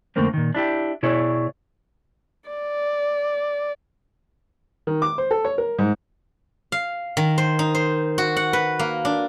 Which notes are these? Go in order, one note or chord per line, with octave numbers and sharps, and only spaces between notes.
F2 D3 A3 A#3 C4
A#2 D#3
D4 E4 G4
B2 E4 G#4 C#5 D5
D5
D#3
D6
C5
A4
C#5
A#4
G#2
F5
D#3
C5
D#4
C5
F#4
F#5
B4
A#3
D4